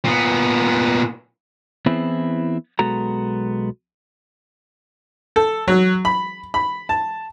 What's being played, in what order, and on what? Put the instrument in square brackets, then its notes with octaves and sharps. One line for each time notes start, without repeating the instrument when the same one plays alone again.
[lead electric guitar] A#2 B3
[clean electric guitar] E3 B3 C4 E4 G#4
B1 G#3 B3 F#4 A4 A#5
[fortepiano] A4
F#3
B5
B5
A5